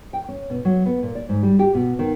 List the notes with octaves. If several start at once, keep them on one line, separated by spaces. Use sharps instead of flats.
G5
C#4
B2
F#3
B3
A#2
D5
G#2
G3
G4
B2
D#3